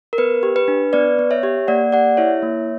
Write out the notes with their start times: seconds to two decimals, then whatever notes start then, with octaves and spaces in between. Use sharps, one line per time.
0.13 A#4
0.18 B3 B4
0.43 G4
0.56 B4
0.68 D4
0.93 B3 B4 D5
1.19 B3
1.31 C#5 E5
1.43 G4
1.68 A#3 D5 F#5
1.92 G4 D5 F#5
2.17 E4 C#5 E5
2.42 A#3